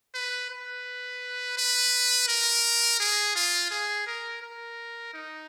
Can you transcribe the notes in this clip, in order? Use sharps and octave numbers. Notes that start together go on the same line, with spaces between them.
B4
B4
B4
A#4
G#4
F4
G#4
A#4
A#4
D#4